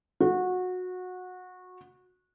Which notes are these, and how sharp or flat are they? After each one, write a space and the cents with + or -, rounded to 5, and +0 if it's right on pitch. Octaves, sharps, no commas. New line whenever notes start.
F#4 -20